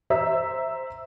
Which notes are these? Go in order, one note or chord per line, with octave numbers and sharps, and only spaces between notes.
C5 E5 A#5 E6 B6